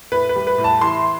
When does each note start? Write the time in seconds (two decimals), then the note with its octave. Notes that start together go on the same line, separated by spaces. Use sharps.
0.12 A2 B4
0.29 B4
0.36 G3
0.47 B4
0.58 A2
0.64 A5
0.81 E3 C6